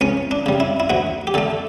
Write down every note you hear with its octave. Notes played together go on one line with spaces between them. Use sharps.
C#2 C#4
D4
C#3 G3
E4
E4
D2 F#4
G4
D3 A3 A4